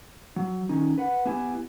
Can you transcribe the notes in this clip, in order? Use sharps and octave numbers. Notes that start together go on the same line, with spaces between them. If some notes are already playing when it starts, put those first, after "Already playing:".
F#3
D#3 C#4 D#4
B4 F#5
B3 E4 G4 G#5